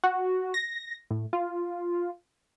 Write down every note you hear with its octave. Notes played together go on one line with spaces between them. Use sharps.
F#4
A#6
A2
F4